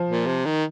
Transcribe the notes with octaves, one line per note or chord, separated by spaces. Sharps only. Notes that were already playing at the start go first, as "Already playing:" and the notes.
Already playing: F3
A#2
C3
D#3